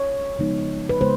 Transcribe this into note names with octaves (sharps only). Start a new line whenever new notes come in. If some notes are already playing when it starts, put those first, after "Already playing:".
Already playing: C#5
C#3 F3 G#3 B3 D#4
B4
C#3 G#3 B3 C5